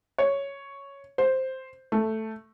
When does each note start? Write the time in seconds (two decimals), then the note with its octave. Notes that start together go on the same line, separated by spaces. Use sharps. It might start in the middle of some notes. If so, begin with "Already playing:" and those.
0.18 C#5
1.18 C5
1.92 A3